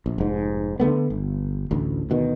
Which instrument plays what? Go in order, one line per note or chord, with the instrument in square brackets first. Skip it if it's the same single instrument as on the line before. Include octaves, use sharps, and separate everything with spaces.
[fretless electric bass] A#1
F1 G#2
D3 E3 A3 B3
G1
A1 D2
D2 B2 D#3